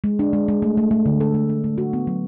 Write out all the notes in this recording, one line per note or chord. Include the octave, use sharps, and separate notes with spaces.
G#3
D4
G#3
G#3
A3
A3
A3
D3
A4
A3
D4
A3
F#4
B3
F#3